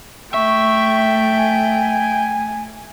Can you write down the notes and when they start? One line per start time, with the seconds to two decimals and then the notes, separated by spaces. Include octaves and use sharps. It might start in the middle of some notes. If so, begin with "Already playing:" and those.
0.34 A3 E5 G5 C#6
1.37 G#5